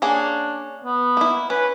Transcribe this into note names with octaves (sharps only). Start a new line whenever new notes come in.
A#3 C#4 D4 G#4
B3
A#3 E4
C#4 B4